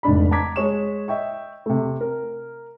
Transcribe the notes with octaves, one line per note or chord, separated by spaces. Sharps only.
F1 G#2 D4 B5
A5 A#5 D6 G#6 B6
G#3 C#5 C#6 E7
D#5 E5 G5 C#6
C3 A3
A#4